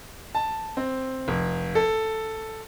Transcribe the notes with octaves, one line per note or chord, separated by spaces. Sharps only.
A5
C4
F1
A4